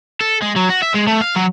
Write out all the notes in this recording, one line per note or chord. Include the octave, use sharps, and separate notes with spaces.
A4
G#3
F#3
F#4
E5
G#3
A3
F5
F#3